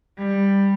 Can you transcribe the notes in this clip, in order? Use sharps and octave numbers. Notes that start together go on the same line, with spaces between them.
G3